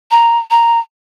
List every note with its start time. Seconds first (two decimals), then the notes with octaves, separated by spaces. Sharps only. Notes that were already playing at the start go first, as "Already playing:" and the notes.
0.11 A#5
0.51 A#5